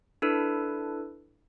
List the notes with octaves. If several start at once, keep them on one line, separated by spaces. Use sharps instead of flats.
D4 E4 A4 B4